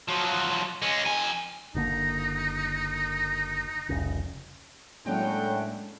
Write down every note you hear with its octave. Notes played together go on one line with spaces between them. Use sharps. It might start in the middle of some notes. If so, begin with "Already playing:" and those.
F3 F#3
G#3 C#4
F2 G#5
F#1 D3 A#3 D#4
F1 C2 C#3
A2 F#3 G#3 A#3 C#4 D4 F#5 G5